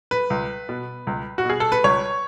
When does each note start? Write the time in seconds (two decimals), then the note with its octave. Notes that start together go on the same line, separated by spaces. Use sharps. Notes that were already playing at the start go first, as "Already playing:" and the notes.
0.11 B4
0.30 C#2
0.69 B2
1.07 C#2
1.38 F#4
1.45 B2 G#4
1.60 A4
1.72 B4
1.84 C#2 C#5